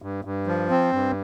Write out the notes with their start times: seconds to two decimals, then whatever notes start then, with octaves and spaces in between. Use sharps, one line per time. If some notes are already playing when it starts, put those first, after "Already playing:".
0.02 G2
0.25 G2
0.47 F3
0.70 C4
0.93 G2